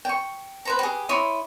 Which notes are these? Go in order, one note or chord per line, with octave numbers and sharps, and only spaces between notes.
G5 C#6
B4 C5 A#5
G4 G#4
E4 C#5 C6 D#6